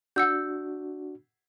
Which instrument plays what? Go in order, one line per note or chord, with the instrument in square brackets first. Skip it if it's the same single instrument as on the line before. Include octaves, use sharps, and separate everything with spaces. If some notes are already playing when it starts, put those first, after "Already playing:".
[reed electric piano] D4 F#4 [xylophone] F#5 E6 G6